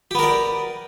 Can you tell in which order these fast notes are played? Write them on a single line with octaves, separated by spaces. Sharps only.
G4 B3 A#4 D5